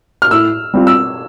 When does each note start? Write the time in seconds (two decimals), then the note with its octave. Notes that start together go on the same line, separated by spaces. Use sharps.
0.22 F6
0.31 A2 E6
0.74 G3 C4 F4
0.87 E6